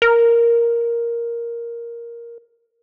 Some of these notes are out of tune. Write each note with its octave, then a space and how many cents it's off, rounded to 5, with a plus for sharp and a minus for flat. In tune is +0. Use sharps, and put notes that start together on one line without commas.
A#4 +5